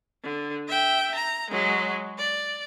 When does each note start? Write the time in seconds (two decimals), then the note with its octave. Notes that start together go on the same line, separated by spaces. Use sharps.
0.24 D3
0.68 E5 G5
1.15 A#5
1.51 F#3 G#3
2.18 D5